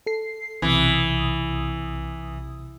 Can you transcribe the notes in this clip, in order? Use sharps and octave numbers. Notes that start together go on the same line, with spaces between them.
A4 C7
B1 C3 E3 D#6